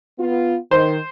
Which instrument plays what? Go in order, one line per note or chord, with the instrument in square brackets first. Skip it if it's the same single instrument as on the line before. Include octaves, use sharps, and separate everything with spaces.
[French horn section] B3 F4
[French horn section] D#3 [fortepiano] C5